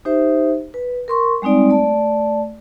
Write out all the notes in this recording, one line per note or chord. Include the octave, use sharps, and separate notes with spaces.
D#4 G4 C5 E5
B4
A#4 C6 C#6
G3 G#3 C4 D#4 D5
A3 D5 A5